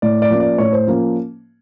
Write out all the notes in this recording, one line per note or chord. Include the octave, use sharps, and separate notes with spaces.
A2 D5
D5
F3 A#3 C#4
D5
A2 C#5
C5
F3 A#3 C#4